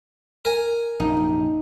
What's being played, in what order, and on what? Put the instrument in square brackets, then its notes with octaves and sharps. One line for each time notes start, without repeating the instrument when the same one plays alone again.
[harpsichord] A#4 G#5
[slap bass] A#1 F#2 C3 [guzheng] D#4